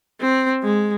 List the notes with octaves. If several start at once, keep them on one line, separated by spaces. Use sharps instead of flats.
C4
G#3